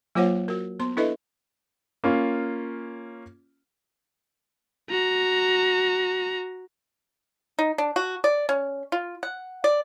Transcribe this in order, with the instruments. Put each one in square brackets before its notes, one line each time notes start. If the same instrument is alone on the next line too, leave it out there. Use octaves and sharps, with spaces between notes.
[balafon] F#3 A#3 F4 C5 C#5 F#5
F#4 A#4
B3 C5 C6
D4 E4 A4 B4 D#5 E5
[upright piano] A#3 C#4 F4
[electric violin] F#4 A#5
[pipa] D#4
D4
F#4
D5
C#4
F4
F#5
D5